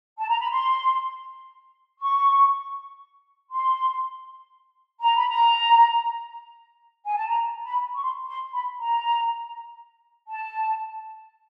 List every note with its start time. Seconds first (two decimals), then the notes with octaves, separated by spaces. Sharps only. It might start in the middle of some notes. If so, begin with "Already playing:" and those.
0.18 A5
0.28 A#5
0.39 B5
0.50 C6
2.00 C#6
3.51 C6
5.01 A#5
5.15 B5
5.28 A#5
7.05 G#5
7.16 A5
7.27 A#5
7.65 B5
7.94 C#6
8.02 C6
8.27 C6
8.53 B5
8.78 A#5
10.28 A5